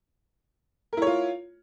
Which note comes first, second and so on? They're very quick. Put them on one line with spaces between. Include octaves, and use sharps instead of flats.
A#4 E4 C#5 F4